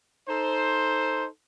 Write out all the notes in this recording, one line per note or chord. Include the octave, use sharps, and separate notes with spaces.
D#4 A4 C5